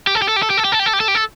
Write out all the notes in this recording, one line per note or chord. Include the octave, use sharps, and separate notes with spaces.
G4
A4
G4
A4
G4
A4
G4
A4
G4
A4
G4
A4
G4
A4
G4
A4